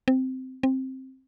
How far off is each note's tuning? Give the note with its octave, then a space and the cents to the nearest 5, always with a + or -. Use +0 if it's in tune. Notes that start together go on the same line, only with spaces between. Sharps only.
C4 -10
C4 +10